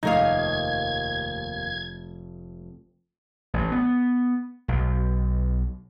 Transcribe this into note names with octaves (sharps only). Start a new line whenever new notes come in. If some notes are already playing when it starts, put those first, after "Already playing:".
F1 D#2 A3 D#4 A#4 F5 D#6 G#6
A1
B3
B1